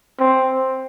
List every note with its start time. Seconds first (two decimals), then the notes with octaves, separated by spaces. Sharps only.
0.20 C4